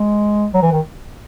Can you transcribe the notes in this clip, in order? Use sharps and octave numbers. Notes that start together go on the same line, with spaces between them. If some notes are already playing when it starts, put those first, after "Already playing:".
Already playing: G#3
F#3
E3
D#3